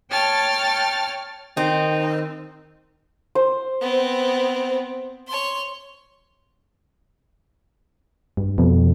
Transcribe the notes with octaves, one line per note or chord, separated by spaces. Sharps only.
C#5 G5 A5 F6 A6
D#3 C4 D#4
C5
B3 C4
C#5 C6
G2
F2 B2